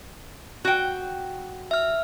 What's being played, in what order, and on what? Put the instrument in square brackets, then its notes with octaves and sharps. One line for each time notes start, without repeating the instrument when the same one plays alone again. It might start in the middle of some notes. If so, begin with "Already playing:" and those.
[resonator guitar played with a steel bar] F#4 G5
[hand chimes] E5 F6